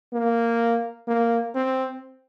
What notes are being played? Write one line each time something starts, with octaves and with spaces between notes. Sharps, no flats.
A#3
A#3
C4